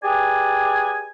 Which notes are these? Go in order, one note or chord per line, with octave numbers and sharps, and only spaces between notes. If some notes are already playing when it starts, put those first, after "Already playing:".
G4 G#4 B4 D5 G#5